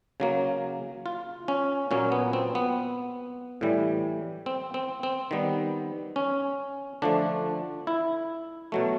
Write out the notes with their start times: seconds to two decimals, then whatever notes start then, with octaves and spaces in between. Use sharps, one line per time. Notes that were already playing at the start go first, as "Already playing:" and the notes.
0.20 C#3 F#3 A#3
1.06 F4
1.48 C#4
1.91 A#2 F#3 A#3 C#4
2.12 B3
2.33 C4
2.55 B3
3.61 A2 E3 G3
4.46 C4
4.74 C4
5.03 C4
5.31 D#3 G3 B3
6.16 C#4
7.02 D3 F3 A3 D4
7.87 E4
8.72 B2 F#3 A3